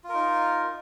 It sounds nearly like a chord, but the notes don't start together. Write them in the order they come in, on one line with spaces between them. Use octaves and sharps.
F4 A#4 D#4